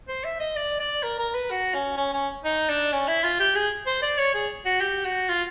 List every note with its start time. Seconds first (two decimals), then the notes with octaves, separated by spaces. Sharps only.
0.08 C5
0.24 E5
0.40 D#5
0.56 D5
0.80 D5
1.03 A#4
1.18 A#4
1.34 B4
1.50 F#4
1.74 C#4
1.97 C#4
2.14 C#4
2.44 D#4
2.69 D4
2.92 C#4
3.08 E4
3.24 F4
3.40 G4
3.55 G#4
3.86 C5
4.02 D5
4.18 C#5
4.34 G#4
4.65 F#4
4.81 G4
5.05 F#4
5.29 F4